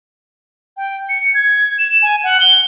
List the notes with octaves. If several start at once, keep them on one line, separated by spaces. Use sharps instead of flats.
G5
C#7
G#6
E7
G#5
F#5
G7